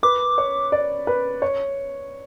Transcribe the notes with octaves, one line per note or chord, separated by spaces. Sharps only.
B4 D6
C#5
D5
B4
C#5